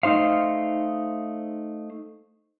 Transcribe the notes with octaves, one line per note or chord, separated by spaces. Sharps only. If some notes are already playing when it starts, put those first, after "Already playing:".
A3 D#4 C5 F5